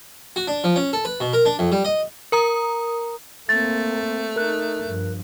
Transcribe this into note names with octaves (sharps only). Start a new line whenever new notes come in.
F#4
D4
F3
C#4
A4
B4
B2
A#4
D4
F2
G3
D#5
A#4 A#5 D#6
A3 A#3 C4 A6
D#4 A#4 F#6
G2 F3